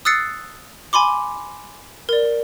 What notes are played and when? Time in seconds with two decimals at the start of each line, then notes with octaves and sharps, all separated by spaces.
0.05 D#6 E6 F#6 A6 C7 C#7
0.93 G#5 B5 C6 D6
2.09 A#4 D5